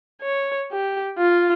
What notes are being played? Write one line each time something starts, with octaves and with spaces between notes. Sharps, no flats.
C#5
G4
F4